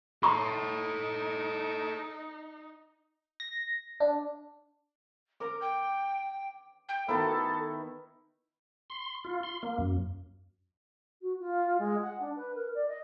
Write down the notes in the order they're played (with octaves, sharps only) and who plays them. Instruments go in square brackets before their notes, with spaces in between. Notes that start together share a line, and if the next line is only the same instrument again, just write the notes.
[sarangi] D#4 [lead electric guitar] A4 C#5 [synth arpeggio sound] A#5 C6
[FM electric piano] A#6
D4
[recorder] A#4 [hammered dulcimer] D6
[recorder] G5
G5
[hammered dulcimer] D#3 B3 E4 [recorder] A4
[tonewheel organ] C6
F4
C6
A#3
F#2
[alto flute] F#4
F4
G#3
F#5
D4
B4
A#4
D5
D#5